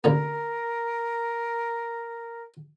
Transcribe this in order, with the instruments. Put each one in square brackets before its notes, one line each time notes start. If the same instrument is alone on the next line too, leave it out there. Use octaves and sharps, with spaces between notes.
[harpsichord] A1 D3 A#3 [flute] A#4